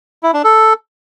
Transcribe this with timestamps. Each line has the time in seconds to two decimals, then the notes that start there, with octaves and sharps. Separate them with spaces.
0.23 E4
0.33 D4
0.44 A4